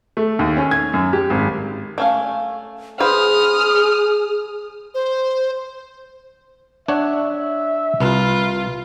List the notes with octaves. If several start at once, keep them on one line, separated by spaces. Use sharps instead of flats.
A3
D#2
C#4
G#6
F#2
G4
G#1
A3 C#4 F5
G#4 B4 C5 D#6 F6
C5
D4 C#5 E5 F#5
C2 F4 B4